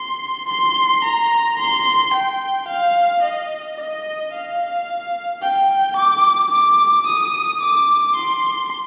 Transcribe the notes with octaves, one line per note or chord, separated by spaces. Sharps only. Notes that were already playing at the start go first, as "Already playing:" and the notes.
Already playing: C6
C6
A#5
C6
G5
F5
D#5
D#5
F5
G5
D6
D6
D#6
D6
C6